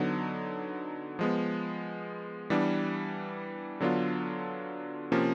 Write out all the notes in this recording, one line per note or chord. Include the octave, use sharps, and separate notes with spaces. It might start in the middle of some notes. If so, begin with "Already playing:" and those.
Already playing: D3 F#3 B3 D#4
F3 G#3 B3
E3 G3 B3 D4
D3 F#3 B3 D4 F4
C3 F3 A#3 C#4